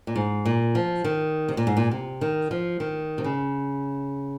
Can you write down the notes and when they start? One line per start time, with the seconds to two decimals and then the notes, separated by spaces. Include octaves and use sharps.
0.07 A#2
0.16 G#2
0.45 A#2
0.75 F3
1.05 D#3
1.48 C3
1.57 A#2
1.67 G#2
1.77 A#2
1.91 C3
2.21 D#3
2.51 F3
2.80 D#3
3.18 C3
3.24 C#3